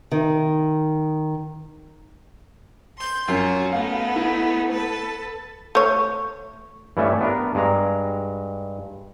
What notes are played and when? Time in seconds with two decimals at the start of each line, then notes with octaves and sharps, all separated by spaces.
0.11 D#3
2.97 C6 G6
3.28 F#2 F4 F#4
3.72 A3 B3 D#4 F5
4.16 E4
4.72 A4 B4 A5
5.75 A3 C#5
6.97 G2 E3 G3 A3 C#4 E5
7.21 B3 D4 A#4
7.55 G2 G#3 A#5